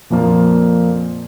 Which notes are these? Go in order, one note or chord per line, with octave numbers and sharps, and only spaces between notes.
F2 A#2 F3 A#3